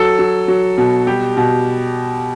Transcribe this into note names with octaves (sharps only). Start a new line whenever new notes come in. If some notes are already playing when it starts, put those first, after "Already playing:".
Already playing: F#3 A4
F#3
F#3
B2
G3 G4
B2